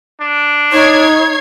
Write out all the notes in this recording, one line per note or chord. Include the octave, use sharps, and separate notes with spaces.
D4
D#4 C#5 G#6 C7